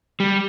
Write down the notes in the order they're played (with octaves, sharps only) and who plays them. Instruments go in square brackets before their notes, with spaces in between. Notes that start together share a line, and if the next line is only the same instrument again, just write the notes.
[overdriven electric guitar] G3